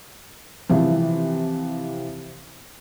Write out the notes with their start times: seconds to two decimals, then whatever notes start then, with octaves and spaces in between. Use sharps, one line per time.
0.69 C3 E3 F3